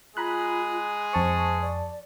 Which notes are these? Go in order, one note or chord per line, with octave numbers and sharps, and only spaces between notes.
G#3 F4 G#4 A#5 B5 F#6
F2 C5 A5 C#6
D5